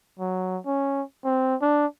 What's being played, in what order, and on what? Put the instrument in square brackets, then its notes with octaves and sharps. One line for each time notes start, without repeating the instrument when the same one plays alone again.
[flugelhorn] F#3
C#4
C4
D4